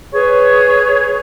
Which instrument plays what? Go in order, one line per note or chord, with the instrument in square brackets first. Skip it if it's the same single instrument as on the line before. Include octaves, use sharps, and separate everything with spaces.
[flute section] G#4 B4 C#5 C#6